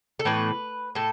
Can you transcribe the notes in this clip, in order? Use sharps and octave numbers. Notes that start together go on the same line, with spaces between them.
A4
A2 E3 B3 B4
A2 A4